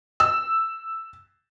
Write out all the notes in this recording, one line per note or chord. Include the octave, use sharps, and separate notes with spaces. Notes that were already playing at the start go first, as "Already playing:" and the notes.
E6